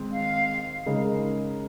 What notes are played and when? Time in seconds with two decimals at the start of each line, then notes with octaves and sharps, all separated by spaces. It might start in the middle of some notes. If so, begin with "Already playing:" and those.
Already playing: D#3 G#3 C4
0.12 F5
0.86 C#3 G#3 D#4 A#4